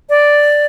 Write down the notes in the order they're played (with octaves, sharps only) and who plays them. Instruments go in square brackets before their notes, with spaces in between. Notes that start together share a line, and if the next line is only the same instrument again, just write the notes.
[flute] D5